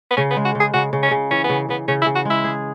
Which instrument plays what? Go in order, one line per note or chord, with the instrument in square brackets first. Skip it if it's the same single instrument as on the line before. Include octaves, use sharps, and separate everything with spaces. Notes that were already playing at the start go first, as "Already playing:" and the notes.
[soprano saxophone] B3
[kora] C#3 [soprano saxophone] C#4
[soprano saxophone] B3
[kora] G#3
[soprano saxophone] F#4
[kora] C#3
[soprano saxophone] G#4
[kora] C#3 [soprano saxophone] F#4
[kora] C#3
[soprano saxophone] C#4
[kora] C#3
[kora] E3 [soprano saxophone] C#4
[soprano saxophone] B3
[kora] C#3
[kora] C#3 [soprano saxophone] B3
[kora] C#3 [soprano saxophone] C#4
[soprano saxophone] E4
[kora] C#3
[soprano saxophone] F#4
[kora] G#3 [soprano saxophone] E4
[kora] G#4